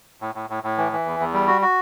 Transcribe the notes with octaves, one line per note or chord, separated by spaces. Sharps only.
A2
A2
A2
A2
E3
E3
E2
E2
G3
F#4
F#4